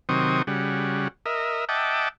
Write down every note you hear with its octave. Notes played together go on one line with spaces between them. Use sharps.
C3 D#3 F#3 C4 C#6 D#6
C#3 G3 F#4
A#4 D#5 E5
D#5 E5 F#5 G5 A5 D6